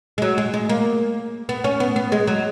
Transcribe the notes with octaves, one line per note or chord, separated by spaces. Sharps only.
G#3
F#3
G#3
G#3
A#3
B3
C#4
B3
B3
G#3
F#3